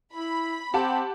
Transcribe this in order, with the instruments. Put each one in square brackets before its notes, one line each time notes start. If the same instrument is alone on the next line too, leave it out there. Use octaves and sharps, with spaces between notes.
[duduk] E4 [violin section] B5
[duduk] C4 [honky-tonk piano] G4 F#5 A5